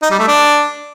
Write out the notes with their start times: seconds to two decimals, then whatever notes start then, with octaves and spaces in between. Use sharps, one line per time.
0.02 D#4
0.11 G3
0.19 A3
0.27 D4